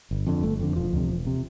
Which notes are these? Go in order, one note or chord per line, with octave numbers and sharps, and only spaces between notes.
G1
F2 D3
G1 A3
F2 D3
E1 F3
D2 C3
E1
C3